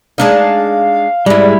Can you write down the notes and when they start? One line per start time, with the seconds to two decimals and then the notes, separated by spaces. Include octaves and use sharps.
0.18 G#3 D4 D#4 F5
1.26 G#2 G3 G#3 E4 D5